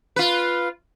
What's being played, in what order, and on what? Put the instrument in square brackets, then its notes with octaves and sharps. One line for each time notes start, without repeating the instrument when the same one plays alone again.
[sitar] F4 B4